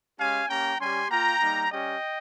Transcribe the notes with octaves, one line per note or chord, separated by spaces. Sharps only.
G#3 C#4 G4 F5 G#5
A#3 C#4 G4 G5 A#5
G3 C#4 G4 G#5 C6
A#3 F4 G5 A#5
G3 A#3 D#4
G3 C#4 G4 D#5 G5